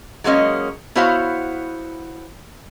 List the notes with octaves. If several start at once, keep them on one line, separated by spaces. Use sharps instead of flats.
F#3 G#3 A#3 C#4 D#5
B3 E4 F#4 C5 C#5 F5